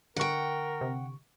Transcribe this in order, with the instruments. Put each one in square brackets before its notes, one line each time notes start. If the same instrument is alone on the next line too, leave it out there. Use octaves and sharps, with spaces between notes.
[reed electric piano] D3 C#6 [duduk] A#4 [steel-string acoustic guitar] F#5 G5
[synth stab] C3